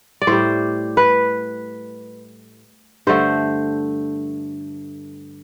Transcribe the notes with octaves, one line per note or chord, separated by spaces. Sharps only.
D5
A2 G3 C5
B4
G2 D3 A3 C5